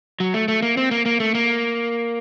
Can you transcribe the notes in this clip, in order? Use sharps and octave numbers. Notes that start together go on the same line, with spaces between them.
F#3
A3
A3
A#3
C4
A#3
A#3
A3
A#3